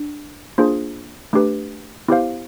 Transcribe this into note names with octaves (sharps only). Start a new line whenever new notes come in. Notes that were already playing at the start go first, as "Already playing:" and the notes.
Already playing: D4
A#3 D4 F4 G#4 C5
A3 D4 G4 B4
B3 E4 G4 C5 F5